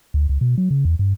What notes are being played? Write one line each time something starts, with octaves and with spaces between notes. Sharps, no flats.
D2
C#2
B2
F#3
C#3
E2
G2